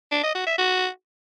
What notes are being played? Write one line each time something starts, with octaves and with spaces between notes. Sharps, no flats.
D4
D#5
F#4
E5
F#4